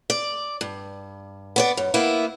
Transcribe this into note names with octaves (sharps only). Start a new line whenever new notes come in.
D5
G2
B3 C#5 D5
F#2
A#3 B3 E4